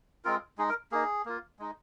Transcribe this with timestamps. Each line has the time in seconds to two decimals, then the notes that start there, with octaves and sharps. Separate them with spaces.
0.25 G#3 C4 F4 A#4
0.58 G#3 D#4 G#4
0.69 A#4
0.92 A#3 D#4 G#4
1.26 A#3 F4
1.59 G#3 D#4